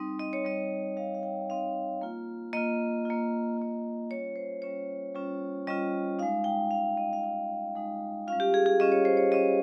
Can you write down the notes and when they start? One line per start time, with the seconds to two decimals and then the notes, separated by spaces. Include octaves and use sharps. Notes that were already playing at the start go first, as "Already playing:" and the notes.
Already playing: G3 C4 D#4
0.19 D#5
0.33 C#5
0.44 G3 C4 D#4 D#5
0.96 G3 C4 D#4 F5
1.15 F5
1.23 G5
1.49 G3 C4 D#4 F5
2.01 A#3 F4
2.53 A#3 F4 D#5
3.05 A#3 F4
3.58 A#3 F4
4.10 G3 C#4 F4 C#5
4.36 C5
4.62 G3 C#4 F4 C#5
5.14 G3 C#4 F4
5.67 G3 C#4 F4 D#5
6.19 D#4 F5
6.23 G#3
6.44 G5
6.71 G#3 D#4 F5
6.97 D#5
7.13 F5
7.23 G#3 D#4 G5
7.75 G#3 D#4
8.27 G3 C#4 F4 F5
8.40 G4
8.54 G#4
8.66 G#4
8.80 G3 C#4 F4 D#5
8.92 C#5
9.05 C5
9.17 C#5
9.32 G3 C#4 F4 D#5